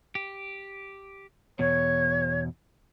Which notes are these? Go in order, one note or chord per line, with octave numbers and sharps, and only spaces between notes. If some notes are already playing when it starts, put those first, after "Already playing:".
G4
E2 B2 C#5